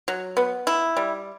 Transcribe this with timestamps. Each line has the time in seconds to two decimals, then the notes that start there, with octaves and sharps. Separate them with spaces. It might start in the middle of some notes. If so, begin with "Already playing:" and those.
0.08 F#3
0.37 B3
0.67 E4
0.97 G3